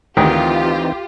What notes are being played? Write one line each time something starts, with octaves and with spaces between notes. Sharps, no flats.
D2 D#3 E3 C4 D#4 F4 G4